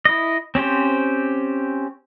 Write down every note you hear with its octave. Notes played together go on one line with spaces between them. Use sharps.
E4 D#5
C4 C#4 G4 C5